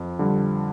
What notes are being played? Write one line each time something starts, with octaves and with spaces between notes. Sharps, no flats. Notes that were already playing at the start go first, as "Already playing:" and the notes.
Already playing: F2
D3 G3